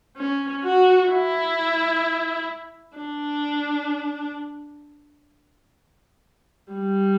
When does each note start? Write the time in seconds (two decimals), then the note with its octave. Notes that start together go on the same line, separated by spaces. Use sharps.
0.17 C#4
0.63 F#4
1.09 E4
2.97 D4
6.72 G3